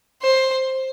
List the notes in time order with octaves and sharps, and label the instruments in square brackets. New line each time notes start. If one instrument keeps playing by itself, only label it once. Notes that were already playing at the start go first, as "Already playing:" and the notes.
[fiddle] C5